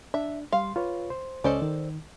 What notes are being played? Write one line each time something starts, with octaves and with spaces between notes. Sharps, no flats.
D4 E5
G3 F5 C6
F4 B4 C#5
C5
C#2 C#4 A4 C5 D5 D#5
D#3